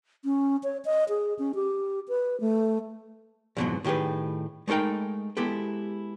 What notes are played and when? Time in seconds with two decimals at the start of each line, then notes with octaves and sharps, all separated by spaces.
0.25 C#4
0.63 C#5
0.85 D#5
1.09 G#4
1.39 C#4
1.55 G4
2.08 B4
2.40 A3
3.57 F2 G#2 B2 D3 E3 F#3
3.84 A2 D#3 G4 G#4 B4
4.68 G#3 A3 D#4 A#4 G5
5.37 G#3 B3 E4 G4 A4